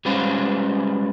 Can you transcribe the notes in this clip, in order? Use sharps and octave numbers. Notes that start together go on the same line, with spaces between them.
G3 G#3 C#4 F4 B4 C5